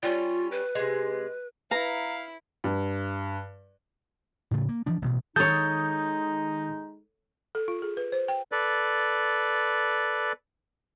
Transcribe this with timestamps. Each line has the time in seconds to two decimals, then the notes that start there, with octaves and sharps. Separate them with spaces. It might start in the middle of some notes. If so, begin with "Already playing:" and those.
0.03 G3 C#4 F4
0.51 B4
0.75 C3 G#3
1.71 E4 B4 F5 A#5
2.64 G2
4.51 A2 C#3 A3
4.69 A#3
4.86 E3 F3 D4
5.02 A1 B2
5.36 D#3 G#3 D#4 A4 C#5 D#6 G6
7.55 A4
7.68 F4
7.82 G#4
7.97 B4
8.12 C5
8.28 G5
8.52 A4 B4 D5